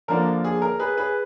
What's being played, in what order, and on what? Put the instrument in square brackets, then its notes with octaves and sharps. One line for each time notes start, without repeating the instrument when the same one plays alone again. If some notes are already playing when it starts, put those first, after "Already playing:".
[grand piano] D3 F3 A#3 D4 A#4
G#4
A#4
G#4 B4
G#4 B4